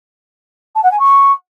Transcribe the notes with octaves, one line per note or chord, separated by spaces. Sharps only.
A5
F#5
G#5
C#6